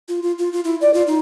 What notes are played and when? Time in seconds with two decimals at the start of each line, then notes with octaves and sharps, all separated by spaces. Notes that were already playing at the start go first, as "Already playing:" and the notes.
0.08 F4
0.22 F4
0.38 F4
0.52 F4
0.64 E4
0.81 D5
0.94 F4
1.07 D#4